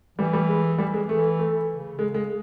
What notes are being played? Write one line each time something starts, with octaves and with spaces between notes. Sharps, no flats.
E3 G3
G3
G#3
G3
G#3
E3 A3
A3
C#3
G#3
G#3